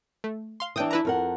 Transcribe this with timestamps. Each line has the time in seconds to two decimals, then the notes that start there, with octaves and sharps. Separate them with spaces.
0.24 A3
0.60 F5 C6
0.76 E3 D4 G5 D#6
0.91 E4 B4 A#5
1.05 F2 A#4 F#5